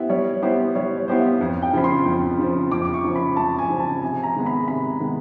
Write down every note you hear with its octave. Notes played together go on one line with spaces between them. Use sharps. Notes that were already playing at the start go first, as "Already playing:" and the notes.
Already playing: B3 E4 G4 C5
G3 C#5
B3 E4 G4 C5
G3 C#5
C#5
B3 E4 G4 C5
F5
F2
G5
C#3 F3 B5
C6
F2
C#3 F3
F2 D6
D6
C#6
C#3 F3
B5
F2 A5
G#5
C#3 F3
A5
C3 G#5
A#5
D#3 G#3 B3
B5
C3 B5
D#3 G#3 B3